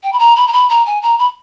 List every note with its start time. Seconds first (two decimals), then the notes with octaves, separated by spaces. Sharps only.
0.03 G5
0.13 B5
0.19 A#5
0.36 B5
0.47 A#5
0.53 B5
0.70 A#5
0.86 G#5
1.02 A#5
1.19 B5